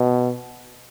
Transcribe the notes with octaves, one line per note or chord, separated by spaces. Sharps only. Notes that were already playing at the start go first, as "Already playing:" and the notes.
Already playing: B2